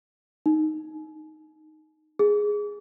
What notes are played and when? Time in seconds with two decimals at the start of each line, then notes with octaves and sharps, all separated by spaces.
0.46 D#4
2.19 G#4